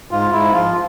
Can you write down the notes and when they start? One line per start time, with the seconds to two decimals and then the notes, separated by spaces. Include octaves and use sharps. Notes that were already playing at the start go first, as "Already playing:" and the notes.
0.11 G#2 F4
0.32 G#2 E4
0.53 F3 F4